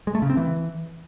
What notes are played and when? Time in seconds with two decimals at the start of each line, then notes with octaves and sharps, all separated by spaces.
0.07 G#3
0.15 A3
0.22 C#3
0.30 C4
0.37 E3